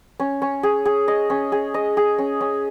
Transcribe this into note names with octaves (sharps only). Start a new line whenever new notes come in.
C#4
C#4
G#4
G#4
D#5
C#4
G#4
D#5
G#4
C#4
C#4